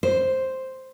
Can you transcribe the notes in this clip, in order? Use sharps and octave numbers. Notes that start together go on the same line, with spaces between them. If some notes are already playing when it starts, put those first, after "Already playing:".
C5